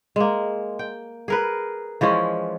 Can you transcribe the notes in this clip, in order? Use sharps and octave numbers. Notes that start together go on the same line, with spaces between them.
G#3 A#3
G5
G#4 A#4 B4
E3 F3 G#3 C#4